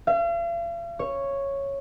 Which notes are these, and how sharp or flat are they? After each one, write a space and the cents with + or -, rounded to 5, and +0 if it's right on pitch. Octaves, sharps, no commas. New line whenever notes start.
F5 -45
C#5 -5